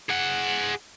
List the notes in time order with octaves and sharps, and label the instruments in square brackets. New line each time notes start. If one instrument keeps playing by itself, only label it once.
[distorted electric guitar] G#4 F#5